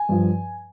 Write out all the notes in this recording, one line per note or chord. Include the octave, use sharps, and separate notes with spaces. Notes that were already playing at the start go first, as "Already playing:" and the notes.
Already playing: G#5
G2 F3